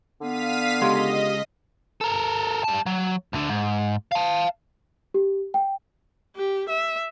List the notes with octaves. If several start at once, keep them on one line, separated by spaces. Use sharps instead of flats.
D3 B3 F5 B6 D#7
C#2 G#3 G4 D#5 C6
A4 A#4
G3 A5
F#3
D2 D3
G#2
F5 A5
G4
G5
G4
E5